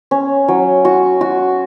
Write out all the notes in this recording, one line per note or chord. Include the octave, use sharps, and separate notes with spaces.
C#4
F#3
F#4
F#4